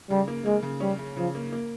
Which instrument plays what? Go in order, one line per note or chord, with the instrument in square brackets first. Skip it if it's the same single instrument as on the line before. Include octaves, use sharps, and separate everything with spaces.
[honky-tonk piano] C#3 [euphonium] G3
[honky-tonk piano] A#3
[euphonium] G#3 [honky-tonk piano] A#3
[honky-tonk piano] C#3
[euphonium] G3 [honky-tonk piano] C#4
[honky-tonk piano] C#3
[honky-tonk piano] C#3 [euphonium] F3
[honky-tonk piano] A#3
A#3